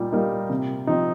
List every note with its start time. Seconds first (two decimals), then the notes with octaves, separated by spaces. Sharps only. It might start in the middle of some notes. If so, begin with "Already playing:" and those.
Already playing: A#2 G3 D#4
0.12 G3 A#3 D#4
0.50 C3
0.87 F3 C4 D#4